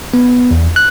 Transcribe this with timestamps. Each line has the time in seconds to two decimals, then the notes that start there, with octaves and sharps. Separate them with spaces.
0.14 B3
0.51 E2
0.76 F#6